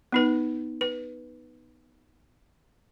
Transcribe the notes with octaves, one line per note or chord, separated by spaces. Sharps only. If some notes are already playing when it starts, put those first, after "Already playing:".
B3 D#4 B4
B4